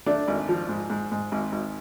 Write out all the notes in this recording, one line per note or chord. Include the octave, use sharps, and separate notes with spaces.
A3 D4
G#1
F3
G#2
G#2
G#2
G#1
G#1